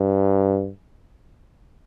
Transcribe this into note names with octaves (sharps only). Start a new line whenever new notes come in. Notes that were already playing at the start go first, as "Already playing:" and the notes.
Already playing: G2